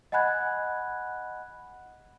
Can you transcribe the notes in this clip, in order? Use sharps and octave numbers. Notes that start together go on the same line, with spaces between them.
D#5 F#5 G#5 B5 F#6 G#6